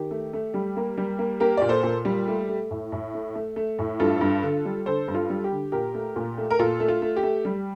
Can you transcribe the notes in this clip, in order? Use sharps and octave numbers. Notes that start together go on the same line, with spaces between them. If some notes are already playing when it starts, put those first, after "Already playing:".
Already playing: D#3 G4
A3
A3
G3
A#3
G3
A#3
A#3 G4 A#4
A#2 D5
A4 C5
A#2
G3
A3
A3
A2
A2
A3
A3
A3
A2
G2 F4 A4
G2
D3
G3
D3 A4 C5
G2
F4 A4
G3
G4
D3
A#2 G4 A#4
A3
A#2
A3
A#4
A#2 F4 A4
A3
F4
A3
G4
A3
G3